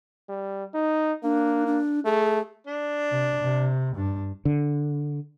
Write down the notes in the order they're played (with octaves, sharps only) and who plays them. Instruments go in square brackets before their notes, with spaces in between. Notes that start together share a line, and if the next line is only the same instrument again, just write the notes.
[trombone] G3
D#4
[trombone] A#3 [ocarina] D4
[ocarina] D4
[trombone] A3 [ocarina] G#4
[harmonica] D4
[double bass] C3
C3
G2 D4
[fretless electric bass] D3